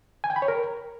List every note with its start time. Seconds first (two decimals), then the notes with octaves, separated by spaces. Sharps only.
0.24 G#5
0.30 G5
0.36 B5
0.42 C#5
0.48 A#4